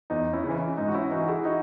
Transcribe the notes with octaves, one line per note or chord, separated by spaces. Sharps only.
E2 D#4
C#4 E4
C#3
E3
C#4
G#2 D#4
F#4
C#4 E4
E3 D#4 F#4
F#4
E4 G#4
D#4 F#4